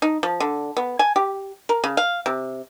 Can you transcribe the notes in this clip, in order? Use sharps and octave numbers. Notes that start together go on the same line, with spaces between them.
D#4
F3
D3
B3
G#5
G4
A#4
C#3
F5
C3